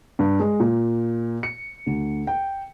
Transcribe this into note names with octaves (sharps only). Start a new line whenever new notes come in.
G2
G#3
A#2
C#7
D2
G5